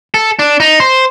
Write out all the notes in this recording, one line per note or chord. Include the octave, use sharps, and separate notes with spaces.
A4
D4
D#4
C5